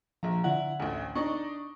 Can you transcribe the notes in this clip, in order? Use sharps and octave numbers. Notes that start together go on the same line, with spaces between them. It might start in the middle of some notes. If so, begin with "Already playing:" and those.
A#1 F3 A#5
D3 E4 F#5
A1 D2
D4 D#4 D5 C#6